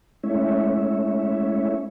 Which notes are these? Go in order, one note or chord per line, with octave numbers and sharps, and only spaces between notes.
G#3 A3 C#4 E4 C#5 E5